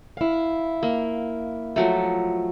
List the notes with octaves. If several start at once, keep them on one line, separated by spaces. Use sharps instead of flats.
E4 F5
A#3
F3 F#3 A3